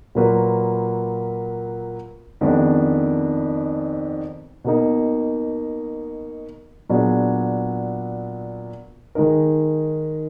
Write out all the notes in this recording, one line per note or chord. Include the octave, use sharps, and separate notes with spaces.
A#2 F#3 A#3 F4 B4
F2 D#3 G#3 B3 D4
B2 A#3 D#4
A#2 F#3 B3 D4 G#4
D#3 G#3 D#4 A#4